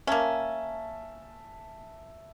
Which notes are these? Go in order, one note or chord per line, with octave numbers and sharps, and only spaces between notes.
A#3 C#4 E5 A5